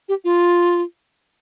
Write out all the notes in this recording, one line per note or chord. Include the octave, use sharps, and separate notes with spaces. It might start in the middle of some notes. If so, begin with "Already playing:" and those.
G4
F4